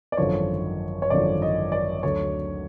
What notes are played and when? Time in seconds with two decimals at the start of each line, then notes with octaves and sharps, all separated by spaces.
0.12 D5
0.17 G#1 F#2 D3 F3 C#5
1.02 C#5
1.10 G#1 F#2 D3 F3 D5
1.42 D#5
1.72 D5
2.03 D2 D3 F#3 C#5